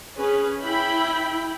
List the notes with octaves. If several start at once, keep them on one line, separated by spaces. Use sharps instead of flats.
C#4 G#4 B4
E4 G5 B5